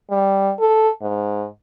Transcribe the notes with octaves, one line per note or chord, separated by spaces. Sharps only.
G3
A4
G#2